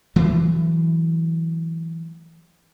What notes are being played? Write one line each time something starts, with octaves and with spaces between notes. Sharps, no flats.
E3 F#3 A3